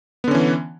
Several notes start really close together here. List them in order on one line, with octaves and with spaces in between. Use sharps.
B3 D3 C#4 E3